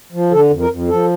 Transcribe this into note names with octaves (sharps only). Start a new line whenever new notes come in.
F3
D3 A4
F2
A#4
F2
F3 A4